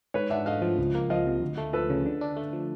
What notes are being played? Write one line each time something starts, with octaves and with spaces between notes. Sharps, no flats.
G#2 B4 C#5
D4 E5 F#5
A3 D#5 F5
F3
C#2
A#3
F3 D#5 F5
C3
D2
A3
F3 A4 B4
C#3
D3
D4
A3
F3